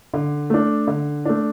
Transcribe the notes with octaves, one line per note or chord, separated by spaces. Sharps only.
D3
A3 D4
D3
A3 D4